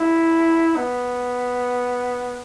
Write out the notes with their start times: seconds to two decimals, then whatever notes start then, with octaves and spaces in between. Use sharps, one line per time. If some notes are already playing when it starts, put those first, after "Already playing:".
Already playing: E4
0.76 B3